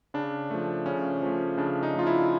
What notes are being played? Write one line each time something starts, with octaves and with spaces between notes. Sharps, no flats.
C#3 D4
F3 A3
C#3 C#4
F3 A3
C#3 D4
D#4
F3 A3 F4
E4